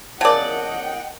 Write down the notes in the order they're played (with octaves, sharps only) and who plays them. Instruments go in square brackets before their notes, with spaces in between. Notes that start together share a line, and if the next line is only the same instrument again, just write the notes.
[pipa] C#3 D5 [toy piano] A#4 A5 [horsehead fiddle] D#5 F#5 [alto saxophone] G5